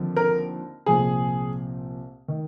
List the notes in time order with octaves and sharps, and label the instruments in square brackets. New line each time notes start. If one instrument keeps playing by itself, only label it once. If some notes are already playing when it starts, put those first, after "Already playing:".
Already playing: [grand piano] D#2 D3 F3 C4
[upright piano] A#4
[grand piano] C2 A#2 F3 C4 [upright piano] G#4
[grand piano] D#3